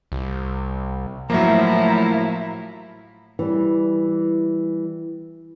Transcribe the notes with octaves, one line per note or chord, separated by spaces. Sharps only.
C2
A2 F3 F#3 A#3 E4 E5 A#5
E3 G3